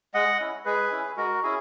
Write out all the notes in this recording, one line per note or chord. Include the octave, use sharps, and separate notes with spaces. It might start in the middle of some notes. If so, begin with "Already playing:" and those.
G#3 D#5 F#5
C#4 E4
G#3 G#4 B4
C#4 E4
G#3 F#4 A#4
C#4 E4 G#4